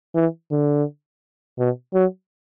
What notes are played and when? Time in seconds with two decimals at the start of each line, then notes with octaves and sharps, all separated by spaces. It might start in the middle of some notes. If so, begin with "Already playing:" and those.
0.15 E3
0.51 D3
1.58 B2
1.94 F#3